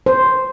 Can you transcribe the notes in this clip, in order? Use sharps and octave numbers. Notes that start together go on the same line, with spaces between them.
C5